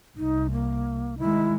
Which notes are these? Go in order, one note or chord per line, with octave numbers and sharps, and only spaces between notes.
C2 D#4
A#3
D#3 G#3 E4